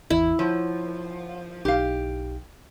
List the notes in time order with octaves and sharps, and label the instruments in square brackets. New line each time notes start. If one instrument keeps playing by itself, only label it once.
[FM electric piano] G#1 E2 E3 [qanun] E4
[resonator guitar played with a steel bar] F3 [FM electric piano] C#5 F#5
[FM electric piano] B1 D#4 [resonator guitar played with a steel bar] G4 F5